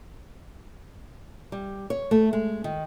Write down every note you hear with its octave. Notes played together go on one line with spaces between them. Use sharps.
G3
C#5
A3
G#3
D#3